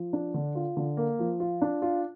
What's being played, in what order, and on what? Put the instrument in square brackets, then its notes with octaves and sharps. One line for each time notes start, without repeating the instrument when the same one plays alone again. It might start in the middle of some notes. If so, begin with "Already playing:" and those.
Already playing: [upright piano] F3
D4
D3
F4
D3
A#3
F3
F4
D4
F4